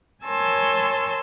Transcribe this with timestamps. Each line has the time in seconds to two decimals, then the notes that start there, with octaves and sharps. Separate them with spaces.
0.25 A#4 C#5 G#5 A5 C6 E6